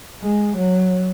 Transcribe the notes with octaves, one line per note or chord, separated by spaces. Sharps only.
G#3
F#3